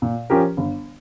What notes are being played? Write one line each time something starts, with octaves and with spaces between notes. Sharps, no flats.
A#2
F3 C#4 G4 A#4
G1